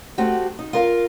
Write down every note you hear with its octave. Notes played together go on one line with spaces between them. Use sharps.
A3 C4 F#4 G4
D#4
F4 A#4 F5